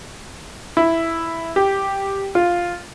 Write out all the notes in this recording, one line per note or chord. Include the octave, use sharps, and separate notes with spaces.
E4
G4
F4